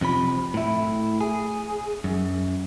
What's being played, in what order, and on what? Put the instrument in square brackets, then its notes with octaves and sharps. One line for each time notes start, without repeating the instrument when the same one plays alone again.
[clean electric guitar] F2 C3 F3 B5
A2 E4
G#4
F#2